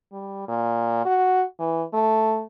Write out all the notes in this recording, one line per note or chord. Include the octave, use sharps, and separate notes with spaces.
G3
A#2
F#4
E3
A3